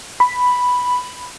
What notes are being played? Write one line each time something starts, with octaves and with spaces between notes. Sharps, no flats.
B5